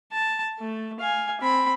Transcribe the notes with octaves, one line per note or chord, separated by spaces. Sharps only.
A5
A3
F5 G#5
C4 B5